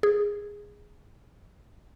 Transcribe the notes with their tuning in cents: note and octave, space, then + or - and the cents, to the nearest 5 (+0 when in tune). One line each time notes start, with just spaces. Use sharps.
G#4 -10